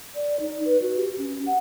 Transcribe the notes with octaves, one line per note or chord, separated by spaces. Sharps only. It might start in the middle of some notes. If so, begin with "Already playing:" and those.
D5
D#4
B4
F#4
G4
C#4
F#5